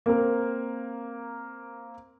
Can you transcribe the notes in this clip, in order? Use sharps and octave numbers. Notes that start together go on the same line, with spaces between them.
A#3 C4 A#4